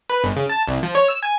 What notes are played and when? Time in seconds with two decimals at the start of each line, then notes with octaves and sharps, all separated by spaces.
0.10 B4
0.24 G1
0.36 C#3
0.50 A5
0.68 C2
0.83 F3
0.95 C#5
1.08 E6
1.23 G#5